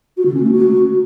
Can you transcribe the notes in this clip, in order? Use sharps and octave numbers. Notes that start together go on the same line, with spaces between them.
F#4
D3
C#4
A3
F#4